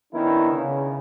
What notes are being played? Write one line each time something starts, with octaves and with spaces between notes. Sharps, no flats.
D#3 B3 C#4 D4 E4
C#3